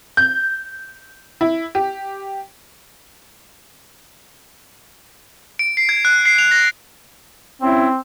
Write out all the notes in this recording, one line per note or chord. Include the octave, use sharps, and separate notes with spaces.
G6
E4
G4
D7
C7
G#6
F#6
C7
F7
A#6
C4 C#4 E4